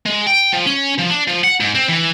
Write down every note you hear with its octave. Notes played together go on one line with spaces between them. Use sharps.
G#3
G5
F3
C#4
F3
D4
F3
F#5
G#2
C4
E3